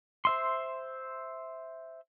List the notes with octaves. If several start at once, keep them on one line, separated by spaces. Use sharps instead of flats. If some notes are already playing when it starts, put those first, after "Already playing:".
C5 E5 C6